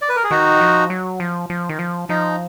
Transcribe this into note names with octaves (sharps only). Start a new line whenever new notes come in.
D5
B4
A#4
G#4
D#3 D#4 F#4
F3
F#3
F3
F3
D#3
F3
F3 D#4